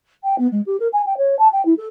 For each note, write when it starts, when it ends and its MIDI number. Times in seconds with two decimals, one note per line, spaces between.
0.23 0.38 79
0.38 0.47 59
0.51 0.60 56
0.66 0.78 67
0.79 0.87 70
0.93 1.02 80
1.06 1.16 79
1.17 1.37 73
1.38 1.48 81
1.52 1.63 79
1.65 1.73 64
1.77 1.86 69